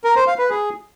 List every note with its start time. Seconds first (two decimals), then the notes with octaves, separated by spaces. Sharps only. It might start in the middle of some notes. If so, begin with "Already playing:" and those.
0.04 A#4
0.16 C5
0.27 F5
0.38 B4
0.50 G#4